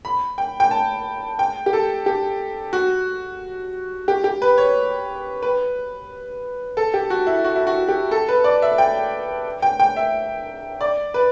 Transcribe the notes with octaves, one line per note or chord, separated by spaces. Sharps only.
B5
G5
G5
A5
G5
G4
A4
G4
F#4
G4
G4
B4
C#5
B4
A4
G4
F#4
E4
F#4
E4
F#4
G4
A4
B4
D5
E5
G5
G5
G5
E5
D5
B4